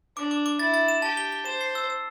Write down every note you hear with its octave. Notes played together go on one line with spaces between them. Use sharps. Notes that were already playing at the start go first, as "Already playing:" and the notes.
D4 D6
D6
D6
E4 A6
A6
E7
G4 A5
G7
G7
C5 E7
C7
E6
E6